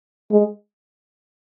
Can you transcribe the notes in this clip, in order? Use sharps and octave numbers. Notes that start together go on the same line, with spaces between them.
G#3